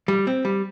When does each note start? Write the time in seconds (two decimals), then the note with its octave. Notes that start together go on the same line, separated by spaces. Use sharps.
0.08 G3
0.27 C4
0.45 G3